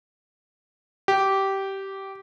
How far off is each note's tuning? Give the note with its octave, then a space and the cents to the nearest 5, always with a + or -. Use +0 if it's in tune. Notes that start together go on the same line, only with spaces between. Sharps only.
G4 -15